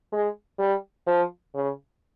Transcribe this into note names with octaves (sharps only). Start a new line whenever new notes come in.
G#3
G3
F3
C#3